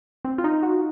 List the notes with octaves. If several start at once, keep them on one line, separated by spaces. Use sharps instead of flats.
C4
F4
D#4
F#4